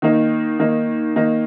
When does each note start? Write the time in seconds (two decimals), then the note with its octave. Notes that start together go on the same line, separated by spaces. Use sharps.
0.02 D#3 A#3 D#4
0.59 D#3 A#3 D#4
1.16 D#3 A#3 D#4